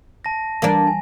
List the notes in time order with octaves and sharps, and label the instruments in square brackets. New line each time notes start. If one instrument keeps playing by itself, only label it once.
[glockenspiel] A5 A#6
[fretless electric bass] E3 G3 [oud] A#3 D4
[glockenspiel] G#5